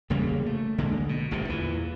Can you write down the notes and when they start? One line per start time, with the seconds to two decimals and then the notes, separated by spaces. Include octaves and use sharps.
0.10 E1 C#3 G3 A#3
0.46 A3
0.78 B1 D3 G#3 A#3
1.09 B2
1.31 G1 D2 A2 D3
1.45 E2 G2 A#2 E3